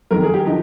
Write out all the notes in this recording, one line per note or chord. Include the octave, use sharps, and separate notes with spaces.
F2 D#3 A#4
G#4
G4
D3 F3 D#4